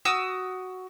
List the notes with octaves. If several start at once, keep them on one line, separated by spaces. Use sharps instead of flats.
F#4 D#6 E6